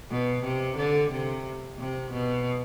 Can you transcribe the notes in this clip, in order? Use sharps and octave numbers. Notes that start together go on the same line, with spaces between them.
B2
C3
D3
C3
C3
B2